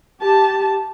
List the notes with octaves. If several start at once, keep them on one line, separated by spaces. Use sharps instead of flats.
G4 A5